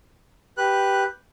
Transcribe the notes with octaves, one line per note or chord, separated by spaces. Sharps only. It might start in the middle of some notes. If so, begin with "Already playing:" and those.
G4 B4 F#6